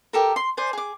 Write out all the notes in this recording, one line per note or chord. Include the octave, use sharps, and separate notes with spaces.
G4 A4 A#4
C6
C5 D5 G#5
G#4 D6